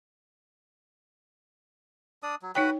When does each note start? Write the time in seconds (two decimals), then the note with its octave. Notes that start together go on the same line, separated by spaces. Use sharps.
2.23 D4 D5 D#6
2.42 F#3
2.55 D#4 F#4 B4 C#5 G5 B5